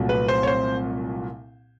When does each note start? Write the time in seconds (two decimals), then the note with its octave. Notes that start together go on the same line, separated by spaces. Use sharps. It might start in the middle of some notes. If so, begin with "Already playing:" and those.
Already playing: C2 A#2 F#3 A3
0.09 B4
0.28 C5
0.43 C#5
0.47 C5